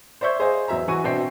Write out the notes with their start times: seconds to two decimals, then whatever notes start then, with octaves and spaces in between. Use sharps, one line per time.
0.21 C5 D5 E5 C#6 G6 G#6
0.39 G#4 C5 D#5 F5 G#5
0.68 E2 F#3 E5 A#5
0.88 E3 F#4 G#5 C#6 D#7
1.04 B2 C4 D4 E5 G5 C7